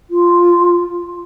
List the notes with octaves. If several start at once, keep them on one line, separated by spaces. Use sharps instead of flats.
F4